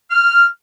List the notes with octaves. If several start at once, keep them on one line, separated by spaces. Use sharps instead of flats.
F6